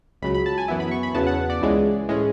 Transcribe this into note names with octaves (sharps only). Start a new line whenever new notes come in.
C#2 C#3 F#3 B5
B5
A5
G#5
F#2 E3 B3 E4
B5
C#6
B5
E2 C#3 F#3 B3 A5
F#5
D5
C#2 C#3 E3 G#3
A2 G#3 C#4